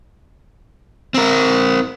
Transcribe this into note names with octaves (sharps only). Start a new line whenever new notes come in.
C4 A#4